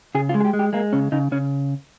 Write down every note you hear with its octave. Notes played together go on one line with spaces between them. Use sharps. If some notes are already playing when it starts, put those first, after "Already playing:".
C#3 G#4
F4
G#3
G#4
G4
G#3
G4
G#3 A#3
C#3 C#4
C#3 D#4
C#3 C#4